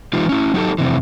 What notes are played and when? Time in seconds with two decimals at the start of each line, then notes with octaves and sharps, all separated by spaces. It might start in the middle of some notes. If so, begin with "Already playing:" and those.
0.13 E3 G#3 D#4 F4 G4
0.29 C#4 E4
0.54 F#3 D#4 G4 A4
0.78 F2 C3 E3